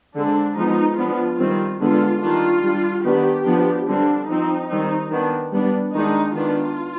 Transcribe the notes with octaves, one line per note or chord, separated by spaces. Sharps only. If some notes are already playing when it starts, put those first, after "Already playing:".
D3 G#3 C4 D4
F3 G#3 B3 D#4
F3 B3 D4 F4
D#3 G3 C4
D3 G#3 B3 D4 F4
D#3 G3 D4 F4
G3 D4
D#3 B3 D4 G4
F3 B3 D4
D3 G3 C4 D4
F3 C4 D#4
D#3 G3 C4 D#4
D#3 B3 D4
G3 B3 D4
D#3 G#3 D4 D#4
D#3 B3 D4 F4